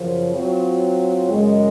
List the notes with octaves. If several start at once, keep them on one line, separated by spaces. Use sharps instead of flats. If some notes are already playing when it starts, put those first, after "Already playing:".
Already playing: F#2 C#3 F3
F#3 C4 F4
F#2 C#3 G#3